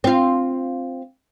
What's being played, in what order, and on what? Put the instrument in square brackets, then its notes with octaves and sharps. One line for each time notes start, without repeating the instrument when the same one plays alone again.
[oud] C4 F4